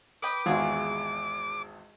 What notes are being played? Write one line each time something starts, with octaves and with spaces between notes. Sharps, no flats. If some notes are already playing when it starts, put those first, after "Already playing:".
B4 D#5 G5 D6
G#1 E2 F4 F#4 G#4